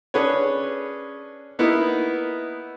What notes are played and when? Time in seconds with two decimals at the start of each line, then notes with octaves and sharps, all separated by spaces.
0.14 C#4 D4 G#4 B4 C#5
1.59 A#3 B3 D#4 E4